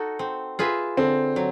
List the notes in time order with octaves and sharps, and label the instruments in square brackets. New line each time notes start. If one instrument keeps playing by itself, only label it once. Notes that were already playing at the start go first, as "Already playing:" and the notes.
Already playing: [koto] D#4 F#4 A4
C4
F4 G#4 B4 E5
[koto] D3 [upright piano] C4
[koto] F#3